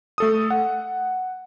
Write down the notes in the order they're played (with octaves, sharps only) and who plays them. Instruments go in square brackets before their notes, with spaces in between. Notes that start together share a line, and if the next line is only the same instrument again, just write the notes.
[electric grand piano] A3 A4 D#6
F#5